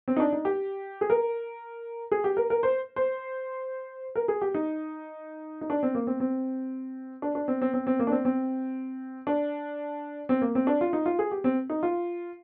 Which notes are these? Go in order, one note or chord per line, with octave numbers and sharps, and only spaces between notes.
C4
D#4
D4
D#4
G4
G#4
A#4
G#4
G4
A#4
A#4
C5
C5
A#4
G#4
G4
D#4
D#4
D4
C4
A#3
C4
C4
D4
D4
C4
C4
C4
C4
A#3
D4
C4
C4
D4
C4
A#3
C4
D4
F4
D#4
F4
G#4
G4
C4
D#4
F4